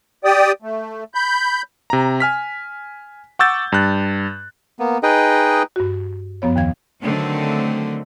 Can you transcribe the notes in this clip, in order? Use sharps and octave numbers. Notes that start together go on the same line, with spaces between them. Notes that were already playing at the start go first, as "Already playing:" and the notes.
G4 D5 G5 D#6
A3
B5 G6
C3 A#5
G#5 F6 B6
F#5 C#6 D6 E6 G6 A6
G2 F#6
A#3 B3
D#4 G#4 B4 D#5 G5
G2 F#4
F#2 F3 B3 C#5
D#2 D#3 F3 F5 G#6
D3 D#3 F#3 A3 C4